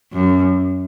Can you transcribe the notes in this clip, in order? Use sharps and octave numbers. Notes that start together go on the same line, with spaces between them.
F#2